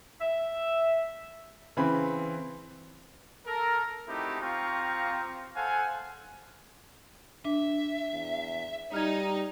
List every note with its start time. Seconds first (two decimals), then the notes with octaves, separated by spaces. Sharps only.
0.21 E5
1.77 C#3 E3 C4 B5
3.47 A4 A#4
4.07 A3 C4 D#4 E4 F#4 G4
4.41 C4 F4 G4 F5 A#5 C#6
5.56 A4 C5 F5 F#5 G#5
7.45 D4 E5
8.13 E2
8.94 G3 D#4 F6 G#6